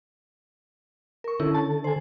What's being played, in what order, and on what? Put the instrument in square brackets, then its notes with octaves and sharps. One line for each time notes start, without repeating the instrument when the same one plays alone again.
[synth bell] A#4 C#6
[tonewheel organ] D3 A4 [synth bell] C#4 E4
[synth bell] A5
C5 G#5